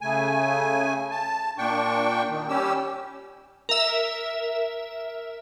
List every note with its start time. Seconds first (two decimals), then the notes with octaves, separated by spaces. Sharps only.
0.01 C#3 A3 G#5
1.11 A5
1.58 A#2 D4 G5 C#6
2.29 D#3
2.49 G3 C#4 G4 E6
3.69 A#4 E5